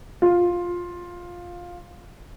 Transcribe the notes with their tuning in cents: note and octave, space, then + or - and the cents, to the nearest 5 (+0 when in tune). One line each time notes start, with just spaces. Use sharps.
F4 +10